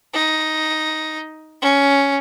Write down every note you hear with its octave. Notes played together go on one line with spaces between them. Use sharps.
D#4
C#4